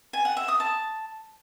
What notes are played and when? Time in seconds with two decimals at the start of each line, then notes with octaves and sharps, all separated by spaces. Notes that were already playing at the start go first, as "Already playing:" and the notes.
0.13 G#5
0.25 F#5
0.37 E5
0.48 D#6
0.60 A5